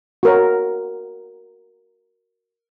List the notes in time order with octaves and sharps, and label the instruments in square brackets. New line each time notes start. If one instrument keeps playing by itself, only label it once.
[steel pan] F#4 A#4 C#5